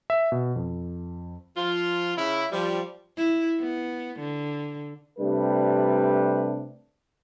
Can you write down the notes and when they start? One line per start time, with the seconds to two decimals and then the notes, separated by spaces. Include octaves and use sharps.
0.10 E5
0.32 B2
0.56 F2
1.57 F3 F4
2.16 C#3 E4
2.52 F3 G3
3.17 E4
3.59 B3
4.19 D3
5.19 C3 G3 A3 D4 B4